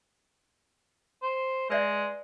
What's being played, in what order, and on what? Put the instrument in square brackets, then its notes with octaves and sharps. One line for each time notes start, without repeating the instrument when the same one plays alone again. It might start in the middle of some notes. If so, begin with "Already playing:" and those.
[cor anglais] C5
[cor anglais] G#3 [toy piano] B4 D5 E5